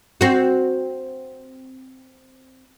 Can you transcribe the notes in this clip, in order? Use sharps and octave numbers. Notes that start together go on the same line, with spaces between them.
C4 F#4